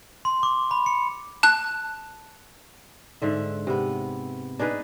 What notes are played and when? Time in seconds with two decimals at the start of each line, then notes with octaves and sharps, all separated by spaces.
0.25 C6
0.43 D6
0.71 B5
0.86 C#7
1.43 A5 F#6
3.22 G#2 D3 E5
3.67 C3 B3
4.59 D4 D#4 G#4 B4